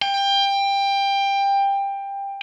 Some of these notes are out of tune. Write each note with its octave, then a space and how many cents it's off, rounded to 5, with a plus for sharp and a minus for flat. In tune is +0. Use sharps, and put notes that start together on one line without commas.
G5 +20